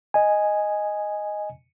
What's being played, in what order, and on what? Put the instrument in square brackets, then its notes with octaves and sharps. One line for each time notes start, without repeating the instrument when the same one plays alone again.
[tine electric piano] D#5 G#5